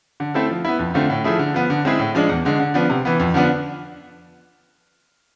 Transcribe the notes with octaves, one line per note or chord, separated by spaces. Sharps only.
D3
A3 C4 E4 A4
F3
B3 E4
F2
D3 A3 C4 F4
A2
F3 A3 E4 G#4
D3
F3 B3
D3
G#3 C4 E4 G#4
A2
F3 G#3 D4
E2
D3 G#3
D3
F3 B3 D4
C3
E3 B3
F2
D3 F3 B3 D4